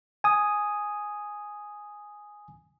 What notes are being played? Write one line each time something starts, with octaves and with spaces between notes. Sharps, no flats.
G#5 D#6